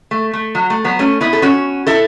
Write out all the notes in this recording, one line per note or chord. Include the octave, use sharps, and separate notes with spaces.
A3
A3
F#3
A3
F#3 B3
A3 C#4
B3 E4
A4
C#4 F#4
E4 A4